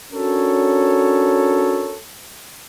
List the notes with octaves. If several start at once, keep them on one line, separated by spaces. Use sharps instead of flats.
C#4 D4 F#4 A4 A#4 C#5